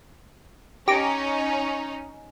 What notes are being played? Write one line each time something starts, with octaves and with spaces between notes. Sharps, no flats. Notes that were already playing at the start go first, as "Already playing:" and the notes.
C#4 D#4 G4 A#5 D6